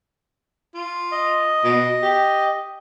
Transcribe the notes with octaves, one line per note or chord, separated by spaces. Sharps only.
F4
D#5
B2
G4